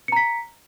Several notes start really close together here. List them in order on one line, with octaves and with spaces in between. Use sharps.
C#7 A#5 B6